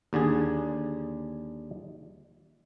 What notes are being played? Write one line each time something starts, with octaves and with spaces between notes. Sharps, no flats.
D#2 D3 D4 G#4